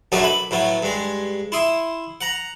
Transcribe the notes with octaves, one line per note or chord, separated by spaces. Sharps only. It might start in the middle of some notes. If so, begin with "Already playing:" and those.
B1 F#2 F#3 A3 D4 D#6
B5
A2 F#3 B3
G2 G#3
E4 C6 D#6
F#5 A#5